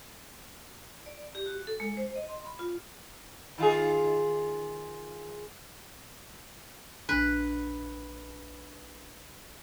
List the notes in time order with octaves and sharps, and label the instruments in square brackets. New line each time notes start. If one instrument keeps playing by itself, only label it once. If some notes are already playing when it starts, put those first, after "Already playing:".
[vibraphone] D5
G4
F#4
A4
G#3
C5
D#5
C6
B5
F4
[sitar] D#3 F4 G#4
[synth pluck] A#1 D4 [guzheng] B4